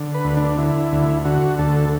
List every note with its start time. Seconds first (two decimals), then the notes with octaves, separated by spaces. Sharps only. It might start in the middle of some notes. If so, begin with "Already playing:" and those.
Already playing: D3
0.14 B4
0.25 D2
0.37 D4
0.58 D3 E4
0.92 D2
1.25 D3 F#4
1.59 D2 A4